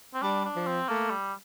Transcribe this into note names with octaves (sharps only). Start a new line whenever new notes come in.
C4
G3 D4
D4
F3
C4
A3 A#3
G3